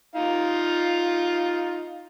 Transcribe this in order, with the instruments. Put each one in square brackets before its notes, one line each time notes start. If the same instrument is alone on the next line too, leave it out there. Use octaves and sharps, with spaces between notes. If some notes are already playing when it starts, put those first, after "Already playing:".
[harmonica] D#4 F4 F5